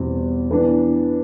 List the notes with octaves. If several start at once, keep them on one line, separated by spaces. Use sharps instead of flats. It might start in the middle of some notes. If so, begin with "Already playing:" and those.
Already playing: E2 B2 G3 C4
E3 B3 D4